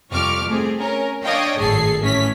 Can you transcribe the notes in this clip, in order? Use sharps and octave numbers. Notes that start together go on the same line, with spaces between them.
C2 F2 C#6 D6 F6
A3 C4 G#4
C#4 A#4
D4 C#5 D#5 F5 G5
G#1 F#2 A2 G#4 A4 C7
A2 E3 C#4 B6